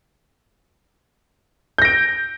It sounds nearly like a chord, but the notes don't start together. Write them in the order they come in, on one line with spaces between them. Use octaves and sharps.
G6 A#6 D7